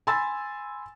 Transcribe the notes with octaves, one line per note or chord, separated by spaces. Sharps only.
G#5 B5 C6 E6 A6